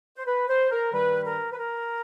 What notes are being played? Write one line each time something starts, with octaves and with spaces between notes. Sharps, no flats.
C5
B4
C5
A#4
G2 D#3 G3 B4
A#4
B4
A#4